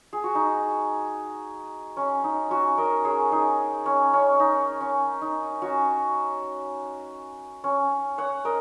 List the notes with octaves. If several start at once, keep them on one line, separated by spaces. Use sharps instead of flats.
G#4
F#4
D#4
C#4
D#4
C#4 F#4
A#4 D#5
G#4 C#5
D#4 G#4
C#4
C#4
D#4
C#4
D#4
C#4 F#4
C#4
C#5 F#5
A#4 D#5